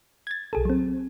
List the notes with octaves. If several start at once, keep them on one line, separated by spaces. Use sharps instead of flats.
G#6 A6
B1 G#4 A4
F#3 C4